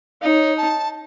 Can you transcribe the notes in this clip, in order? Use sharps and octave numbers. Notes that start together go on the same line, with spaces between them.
D#4 C#5 F5
A5